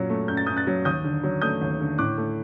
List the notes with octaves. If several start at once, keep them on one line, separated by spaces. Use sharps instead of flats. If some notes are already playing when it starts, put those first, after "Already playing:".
Already playing: F#2 A#2 F#3
A3
F#2 G6
A6
F#2 D#6 G6
F#6 A6
F#3
D#2 D#6 G6
D3
F#3
A3 D#6 G6
D#2
D3
A2 D6 F#6
A3